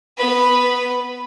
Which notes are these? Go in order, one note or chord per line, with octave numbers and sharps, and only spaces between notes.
B3 B4